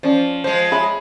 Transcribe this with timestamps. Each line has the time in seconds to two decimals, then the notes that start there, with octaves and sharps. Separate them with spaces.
0.03 F3 C#4 C5 D5
0.44 F3 G#3 C5
0.72 G#4 C#5 E5 B5